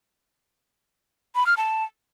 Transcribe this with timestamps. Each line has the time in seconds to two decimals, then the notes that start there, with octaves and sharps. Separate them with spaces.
1.35 B5
1.46 F6
1.57 A5